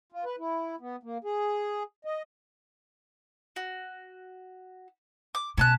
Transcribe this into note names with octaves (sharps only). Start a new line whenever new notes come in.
F4
B4
E4
B3
A#3
G#4
D#5
F#4
D6
B2 C#4 A5 F#6